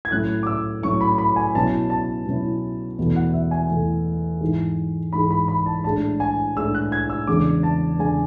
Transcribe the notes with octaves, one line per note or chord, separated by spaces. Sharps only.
G#6
A2 F#3 C#4 E4 F#6
D6
E6
A2 F#3 C#4 E4 C#6
B5
B5
G#5
B2 F#3 C#4 E4 A5
A5
B2 F#3 C#4 E4
E2 B2 A3 E4
F#5
E5
G#5
E2 B2 A3 E4
G#2 E3 G#3
G#2 E3 G#3 B5
B5
B5
A5
A2 G#3 D4 A5
G#5
A2 G#3 D4 E6
F#6
G#6
E6
E2 C#3 G#3 D4 D6
A5
E2 C#3 G#3 D4 G#5